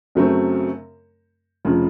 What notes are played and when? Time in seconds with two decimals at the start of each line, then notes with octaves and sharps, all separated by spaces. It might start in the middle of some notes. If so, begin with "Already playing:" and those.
0.15 F#2 C#3 F#3 A3 C4
1.65 F1 C#3 F3